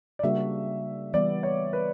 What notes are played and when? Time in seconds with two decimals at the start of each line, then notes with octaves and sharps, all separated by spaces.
0.19 D5
0.23 C#3 G3 A#3 D4 F#4 E5
1.14 E3 G3 B3 D5
1.43 C#5
1.73 B4